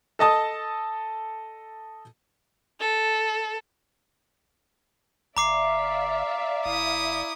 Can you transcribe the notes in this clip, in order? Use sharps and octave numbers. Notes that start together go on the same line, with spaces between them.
A4 D#5 A5 D#6
A4
G1 D5 E5 F5 A#5 D6 C7
F#1 E4 D#6